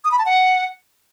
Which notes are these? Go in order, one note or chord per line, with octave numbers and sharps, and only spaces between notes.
D#6
B5
A5
F#5